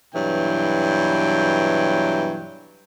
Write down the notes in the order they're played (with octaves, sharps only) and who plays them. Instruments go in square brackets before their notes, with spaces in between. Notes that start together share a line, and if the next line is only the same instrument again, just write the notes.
[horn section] G2 B2 E3 F#3 G5